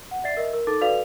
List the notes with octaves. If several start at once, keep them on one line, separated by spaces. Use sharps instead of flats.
F#5
D5 E5 A6 C7
A#4 D#5 E5
A#4
D#4 A4 D6 A6
F#4 A4 B4 D5 F5 F7